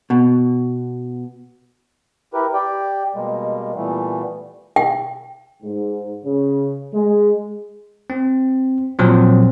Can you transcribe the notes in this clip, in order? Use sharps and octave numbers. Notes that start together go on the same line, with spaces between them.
B2
E4 G4 A#4 B4
G4 D5 G5
B2 G3 G#3 A#3
A#2 E3 G3 A3 B3
G5
G#2
C#3
G#3
C4
A#2 F3 F#3 C4